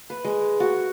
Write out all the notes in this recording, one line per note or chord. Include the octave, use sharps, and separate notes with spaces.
B4
G#3
F#4